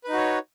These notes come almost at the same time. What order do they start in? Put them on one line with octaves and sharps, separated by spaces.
B4 D#4 F#4 C#5